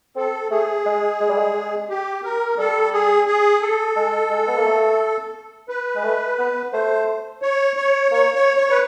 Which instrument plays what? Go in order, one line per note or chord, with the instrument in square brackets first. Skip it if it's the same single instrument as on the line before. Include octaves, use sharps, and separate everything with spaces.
[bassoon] C4 [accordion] A4
[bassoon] A3 [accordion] G#4
[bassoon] G#3
G#3
G3
G#3
[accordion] G4
A#4
[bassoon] G3 [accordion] A4
[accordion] G#4
G#4
A4
[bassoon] G#3
G#3
B3
A#3
A3
[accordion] B4
[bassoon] G#3
A3
B3
[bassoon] A3 [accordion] C5
[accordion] C#5
C#5
[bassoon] A#3 [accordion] C#5
[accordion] C#5
C#5
B4